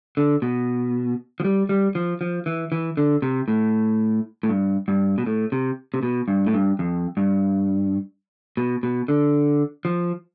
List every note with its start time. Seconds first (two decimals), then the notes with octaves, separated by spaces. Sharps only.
0.17 D3
0.42 B2
1.40 F3
1.44 G3
1.69 G3
1.95 F3
2.21 F3
2.46 E3
2.72 E3
2.97 D3
3.22 C3
3.48 A2
4.43 A2
4.49 G2
4.88 G2
5.18 B2
5.26 A2
5.52 C3
5.94 C3
6.03 B2
6.28 G2
6.46 A2
6.54 G2
6.79 F2
7.17 G2
8.57 B2
8.83 B2
9.08 D3
9.85 F3